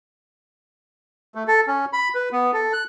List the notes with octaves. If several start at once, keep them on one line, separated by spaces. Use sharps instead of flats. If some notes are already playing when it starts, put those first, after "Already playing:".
A3
A4
C#4
B5
B4
B3
A4
F#6